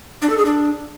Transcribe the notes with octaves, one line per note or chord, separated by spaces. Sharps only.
D4
A4
G#4
D4